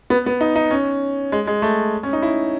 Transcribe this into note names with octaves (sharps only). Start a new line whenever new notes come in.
B3
B3
D#4
D#4
C#4
G#3
G#3
A3
C#4
D#4
E4